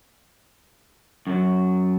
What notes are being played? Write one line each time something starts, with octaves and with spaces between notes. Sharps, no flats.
F#2 F#3